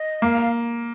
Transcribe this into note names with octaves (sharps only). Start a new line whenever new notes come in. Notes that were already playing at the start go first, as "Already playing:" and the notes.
Already playing: D#5
A#3 F5
F5